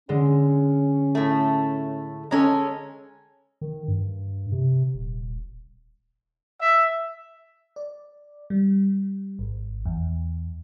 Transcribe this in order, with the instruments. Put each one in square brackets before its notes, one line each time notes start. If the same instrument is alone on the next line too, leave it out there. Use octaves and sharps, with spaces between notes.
[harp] D3 G#3 [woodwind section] C#4
[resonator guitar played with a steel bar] A2 A3
[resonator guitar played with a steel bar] G#3 C#4 A4 [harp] G#5 A#5
[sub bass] D#3
G2
C3
D#1
[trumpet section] E5
[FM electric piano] D5
G3
G#1
E2